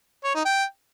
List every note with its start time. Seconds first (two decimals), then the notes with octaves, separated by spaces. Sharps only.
0.24 C#5
0.35 D#4
0.45 G5